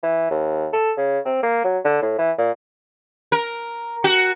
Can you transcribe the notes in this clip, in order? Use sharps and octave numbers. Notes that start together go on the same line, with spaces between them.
E3
D#2
A4
C#3
C4
A#3
F#3
D3
A2
E3
A#2
A#4
F#4